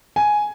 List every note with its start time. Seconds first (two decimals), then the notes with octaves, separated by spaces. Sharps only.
0.16 G#5